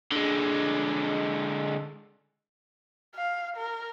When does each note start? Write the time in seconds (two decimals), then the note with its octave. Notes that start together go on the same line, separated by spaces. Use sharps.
0.12 D3 G#3
3.15 F5
3.56 A#4